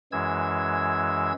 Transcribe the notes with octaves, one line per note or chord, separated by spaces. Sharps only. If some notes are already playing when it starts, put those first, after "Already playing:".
F#2 E3 G#3 E6 G#6